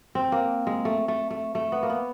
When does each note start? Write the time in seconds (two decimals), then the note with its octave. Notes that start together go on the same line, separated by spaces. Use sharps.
0.15 C4
0.32 A#3
0.67 G#3
0.85 A3
1.08 A3
1.31 A3
1.55 A3
1.72 B3
1.83 A#3
1.90 B3